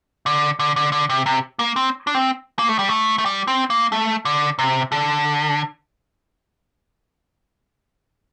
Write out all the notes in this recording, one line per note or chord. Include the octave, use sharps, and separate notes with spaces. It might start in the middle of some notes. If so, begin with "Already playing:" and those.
D3
D3
D3
D3
C3
C3
A#3
C4
D4
C4
A#3
A3
G3
A3
A3
G3
C4
A#3
A3
D3
C3
D3